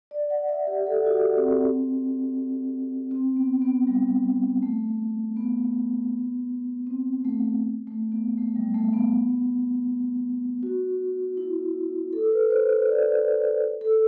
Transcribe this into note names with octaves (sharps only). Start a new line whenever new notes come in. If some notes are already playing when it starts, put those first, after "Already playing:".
D5
F#5
E5
G4
A4
F#4
G4
C4
C4
B3
B3
G3
A3
B3
C4
A3
A3
B3
A3
G3
A3
B3
F#4
E4
A4
B4
C5
D5
A4